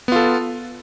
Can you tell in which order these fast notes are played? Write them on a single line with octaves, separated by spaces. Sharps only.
B3 F4 A4